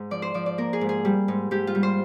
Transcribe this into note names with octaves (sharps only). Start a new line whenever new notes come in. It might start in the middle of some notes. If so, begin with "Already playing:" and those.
Already playing: G#2
F3 D5
C5
F3 D5
D5
A#3 A#4
G#4
G#2
G#4
G3
G#2
G#2 G4
F4
G3
C5